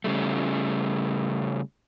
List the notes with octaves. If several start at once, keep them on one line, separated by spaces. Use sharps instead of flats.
C#3 G3 A3